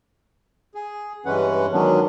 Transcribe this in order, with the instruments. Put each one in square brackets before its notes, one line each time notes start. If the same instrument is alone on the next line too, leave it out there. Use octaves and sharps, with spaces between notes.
[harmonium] G#4
G2 E3 G#3 C#4 B4 F#5
D#3 F#3 G#3 B3 C#4 D4